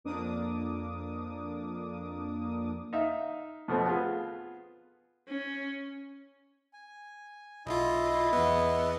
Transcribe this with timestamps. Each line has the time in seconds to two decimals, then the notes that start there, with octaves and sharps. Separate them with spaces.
0.04 F2 A#3 D4 D6 D#6
2.93 D#4 E5 F5
3.68 F2 B2 A3 C4
3.87 B3 F4 G#4
5.28 C#4
6.73 G#5
7.66 B1 E4 F4 D#5
8.33 E2 B3